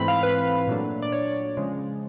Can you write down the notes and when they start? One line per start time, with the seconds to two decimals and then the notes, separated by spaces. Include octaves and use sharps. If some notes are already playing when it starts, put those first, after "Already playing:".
Already playing: G#2 E3 A3 C4 E4 B5
0.08 F5
0.23 B4
0.67 A#2 F#3 A3 D4
1.02 D5
1.12 C#5
1.57 C#3 F3 G#3